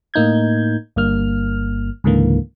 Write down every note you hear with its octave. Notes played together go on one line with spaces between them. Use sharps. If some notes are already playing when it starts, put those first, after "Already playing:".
A2 A#3 D#4 G6 G#6
G1 G2 A#3 F6
C#2 G#2 D3 E3 A#3